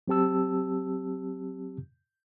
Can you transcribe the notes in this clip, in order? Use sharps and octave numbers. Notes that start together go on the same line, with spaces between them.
F#3 C4 G4 A5 E6